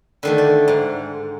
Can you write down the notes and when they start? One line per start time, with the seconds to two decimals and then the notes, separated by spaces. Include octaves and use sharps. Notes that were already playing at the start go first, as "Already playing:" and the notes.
0.23 D3 D#3 A3
0.38 D5
0.68 G#2